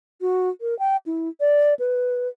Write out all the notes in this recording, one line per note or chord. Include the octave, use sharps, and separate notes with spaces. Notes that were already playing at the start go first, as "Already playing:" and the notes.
F#4
A#4
G5
E4
D5
B4